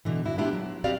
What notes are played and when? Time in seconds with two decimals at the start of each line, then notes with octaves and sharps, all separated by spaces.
0.05 B2 D3 E3
0.24 G2 E4 F#4
0.38 B3 D4 E4 F4 G4
0.53 F#3
0.84 C4 F#4 G4 B4 D5 F5